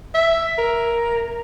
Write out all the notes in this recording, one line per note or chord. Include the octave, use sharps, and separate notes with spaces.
E5
A#4